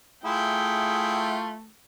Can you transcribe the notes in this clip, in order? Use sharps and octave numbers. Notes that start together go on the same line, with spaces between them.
A3 E4 F4 G#4 G5